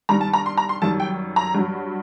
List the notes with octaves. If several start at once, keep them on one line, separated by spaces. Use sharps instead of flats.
G2 D#3 G3 A#5
A5
A#5
C6
A#5
C6
F#2 D#3 G3 A5
G5
A#5
G2 F#3